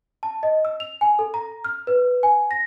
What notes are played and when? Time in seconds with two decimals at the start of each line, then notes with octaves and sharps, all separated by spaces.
0.23 A5
0.43 D#5
0.65 E6
0.80 F7
1.01 G#5
1.19 A4
1.34 A#5
1.64 F6
1.87 B4
2.23 G#5
2.51 A#6